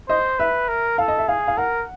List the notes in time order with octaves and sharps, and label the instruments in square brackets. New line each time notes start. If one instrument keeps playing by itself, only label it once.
[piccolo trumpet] C5 [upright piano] D#5
[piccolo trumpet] B4 [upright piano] E5
[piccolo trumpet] A#4
[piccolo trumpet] A4 [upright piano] F5
[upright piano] D#5
E5
[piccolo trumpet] G#4 [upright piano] F5
[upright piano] F5
[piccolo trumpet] A#4 [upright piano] F#5